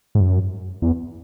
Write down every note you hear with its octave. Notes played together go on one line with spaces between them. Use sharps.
G#2
F#2
E2